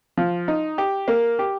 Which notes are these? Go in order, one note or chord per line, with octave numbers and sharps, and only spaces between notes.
F3
D#4
G4
A#3
G4